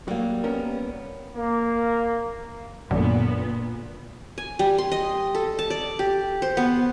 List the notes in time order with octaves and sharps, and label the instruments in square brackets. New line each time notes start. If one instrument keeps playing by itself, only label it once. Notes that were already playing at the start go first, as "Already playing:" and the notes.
[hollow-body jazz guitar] F#3 [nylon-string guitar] G3 A#3
[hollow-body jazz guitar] B3 C#4 A#4
[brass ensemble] A#3
[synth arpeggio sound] A1 F#2 D3 [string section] A#2 B3
[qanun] G#5
G3
C6
D#5
A4
A5
D5
G4
C5
B3